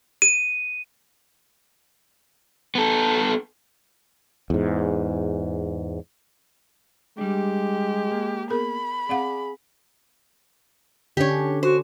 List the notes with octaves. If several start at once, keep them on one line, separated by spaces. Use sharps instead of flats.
D#7
B3 A4
E2 G#2
G3 G#3 D4 G4
A#3
B3 G#4 A#4 B5
C4 G#4 D5 F5 F#5
D3 C#4 D4 G4 C#5
F#4 C5